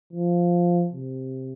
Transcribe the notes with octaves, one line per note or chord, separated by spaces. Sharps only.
F3
C3